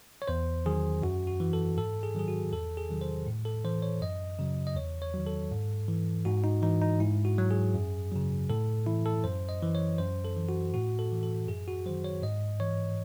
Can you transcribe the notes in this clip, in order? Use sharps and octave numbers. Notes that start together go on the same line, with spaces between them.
C#5
E2 C5
D#3 F#3 G#4
F#2 F#4
F#4
E3
A4
G#2 A4
G#4
D#3 F#3 G#4
F#4
E2 A4
G#4
C3 D#3 F#3
C5
A2
A4
E3 C5
C#5
F#2 D#5
C#3 F#3
D#5
E2 C#5
C#5
D#3 F#3
A4
G#2
E3
G#2 F#4
D#4
E3 D#4
D#4
G#2 E4
F#4
F#3
G#4
F#2
C#3 F#3
A2 A4
E3 E4
A4
F#2 C5
D#5
E3
C#5
F#2 C5
A4
E3
F#4
A2 F#4
A4
E3
A4
F#2 G#4
F#4
D#3 F#3 C5
C#5
G#2 D#5
E3 C#5